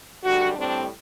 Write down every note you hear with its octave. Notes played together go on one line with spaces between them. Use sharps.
F#2 D3 G3 F#4
A2 G3 C4 D4